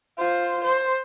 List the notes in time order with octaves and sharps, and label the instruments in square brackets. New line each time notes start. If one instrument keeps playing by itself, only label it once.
[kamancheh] F4 C5
C5